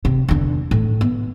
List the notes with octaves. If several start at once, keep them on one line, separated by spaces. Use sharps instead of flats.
C3
E2 D3
A2
B3